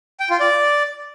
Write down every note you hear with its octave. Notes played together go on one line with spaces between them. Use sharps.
G5
F4
D5